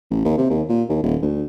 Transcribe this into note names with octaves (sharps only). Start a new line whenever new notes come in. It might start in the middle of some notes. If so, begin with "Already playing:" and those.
A1
D#2
C3
D#2
A#2
D#2
D#1
D2